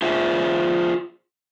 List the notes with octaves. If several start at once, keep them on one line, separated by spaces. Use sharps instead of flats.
F4 G#4 C5 E5